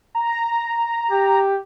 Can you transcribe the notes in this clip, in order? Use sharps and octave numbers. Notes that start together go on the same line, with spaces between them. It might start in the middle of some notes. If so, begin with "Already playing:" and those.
A#5
G4